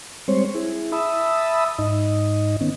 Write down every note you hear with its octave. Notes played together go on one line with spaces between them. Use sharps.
G3 G#3 C4 C5 C#5
E4 G#4
E5 A5 B5 D#6 E6
G#2 D#4 D#5
D#3 B3 C#4